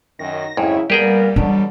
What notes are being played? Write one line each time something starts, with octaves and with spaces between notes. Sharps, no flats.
F#2 D#3 A#6
F2 G#2 C#3 F#3 E4 C#5
A#2 G3 B3 G4 G#4 A#4 G5
B2 D3 E3 F#3 D4